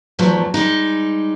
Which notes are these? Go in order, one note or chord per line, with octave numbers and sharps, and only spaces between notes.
E2 G#2 F3 F#3 A3
G3 G#3 D#4